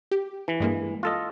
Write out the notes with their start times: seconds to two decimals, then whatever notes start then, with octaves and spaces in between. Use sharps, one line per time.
0.11 G4
0.48 E3
0.60 G2 G#3 A#3
1.03 F4 A4 D#5